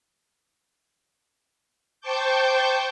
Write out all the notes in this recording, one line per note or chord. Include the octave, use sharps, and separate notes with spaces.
C5 G5 A5 C#6 D6 G6